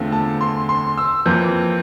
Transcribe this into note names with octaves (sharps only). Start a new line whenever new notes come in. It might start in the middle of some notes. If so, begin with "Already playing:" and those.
Already playing: E2 D3 A3 C4 F4
A5
C6
C6
E6
F2 E3 A#3 G6